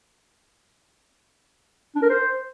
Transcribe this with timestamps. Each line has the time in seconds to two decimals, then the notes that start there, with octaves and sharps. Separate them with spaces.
1.96 D4
2.03 A#4
2.10 C5